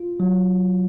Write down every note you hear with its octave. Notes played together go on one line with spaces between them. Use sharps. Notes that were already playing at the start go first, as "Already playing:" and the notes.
Already playing: F4
F#3